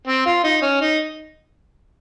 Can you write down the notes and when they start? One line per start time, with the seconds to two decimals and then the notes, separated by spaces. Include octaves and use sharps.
0.07 C4
0.26 F4
0.44 D#4
0.62 C#4
0.81 D#4